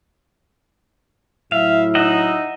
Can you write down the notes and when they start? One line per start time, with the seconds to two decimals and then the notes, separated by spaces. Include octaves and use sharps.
1.52 A2 F#3 E4 E5 F5
1.95 D#4 D#5 E5 F#5